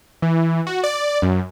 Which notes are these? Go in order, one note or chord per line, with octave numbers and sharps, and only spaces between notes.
E3
F#4
D5
F#2